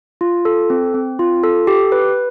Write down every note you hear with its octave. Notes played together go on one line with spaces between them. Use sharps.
F4
A4
C4
C4
F4
A4
G4
B4